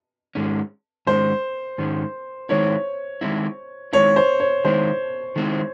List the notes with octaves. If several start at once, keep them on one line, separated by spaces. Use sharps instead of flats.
G#2 D#3 G#3 C#4
G#2 D#3 G#3 C#4 C5
G#2 D#3 G#3 C#4
D#3 G#3 C4 E4 C#5
D#3 G#3 C4 E4
D#3 G#3 C4 E4 C#5
C5
C#5
D#3 G#3 C4 E4 C5
D#3 G#3 C4 E4